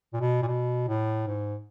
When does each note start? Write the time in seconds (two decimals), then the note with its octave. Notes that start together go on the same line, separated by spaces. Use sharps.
0.13 A#2
0.20 B2
0.42 A#2
0.47 B2
0.88 A2
1.27 G#2